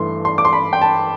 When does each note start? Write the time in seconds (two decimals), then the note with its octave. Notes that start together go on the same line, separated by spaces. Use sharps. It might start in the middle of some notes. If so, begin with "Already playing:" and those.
Already playing: G2 E3 A3 C6
0.25 C6
0.38 D6
0.45 C6
0.53 B5
0.73 G5
0.82 A5